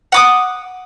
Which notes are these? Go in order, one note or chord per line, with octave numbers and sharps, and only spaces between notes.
F#5 D6 D#6